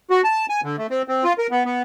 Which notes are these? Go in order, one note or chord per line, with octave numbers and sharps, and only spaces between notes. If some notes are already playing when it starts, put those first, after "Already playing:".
F#4
A5
G#5
D3
A3
C4
C4
F4
A#4
B3
B3